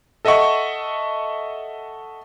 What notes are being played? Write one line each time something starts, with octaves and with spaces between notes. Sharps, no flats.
A4 D#5 E5 F#5 C#6